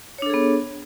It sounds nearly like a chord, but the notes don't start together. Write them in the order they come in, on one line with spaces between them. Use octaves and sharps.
C#5 D4 A4 G#4 B3